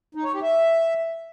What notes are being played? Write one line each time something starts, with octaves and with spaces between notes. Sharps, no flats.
D#4
C#5
G4
E5